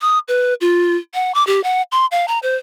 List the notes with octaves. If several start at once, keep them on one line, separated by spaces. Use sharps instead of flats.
D#6
B4
F4
F#5
D6
G4
F#5
C6
F5
A#5
C5